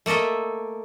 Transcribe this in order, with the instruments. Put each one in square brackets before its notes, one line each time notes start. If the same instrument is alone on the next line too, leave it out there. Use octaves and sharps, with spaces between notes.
[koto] A3 A#3 A4 D#5 E5